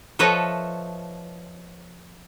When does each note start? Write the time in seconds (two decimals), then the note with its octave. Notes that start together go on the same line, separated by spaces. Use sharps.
0.19 F3 A4 B4 C#5 D#5 E5